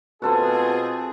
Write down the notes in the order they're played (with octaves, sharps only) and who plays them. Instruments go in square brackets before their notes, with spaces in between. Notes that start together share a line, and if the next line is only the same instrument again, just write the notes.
[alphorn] B2 [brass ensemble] C4 F4 G#4 [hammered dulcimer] F#4 A4 C5